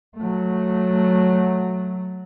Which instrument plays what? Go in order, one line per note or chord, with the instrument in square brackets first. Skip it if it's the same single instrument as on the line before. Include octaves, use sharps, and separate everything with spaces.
[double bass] F#3 A3